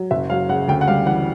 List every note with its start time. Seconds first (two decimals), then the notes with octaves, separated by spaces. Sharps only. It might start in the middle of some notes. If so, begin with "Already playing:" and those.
Already playing: F#3
0.11 F#1 E5
0.30 F#3 F5
0.49 C#3 F#5
0.68 D2 G5
0.81 F#5
0.88 G3 F5
1.06 E3 F#5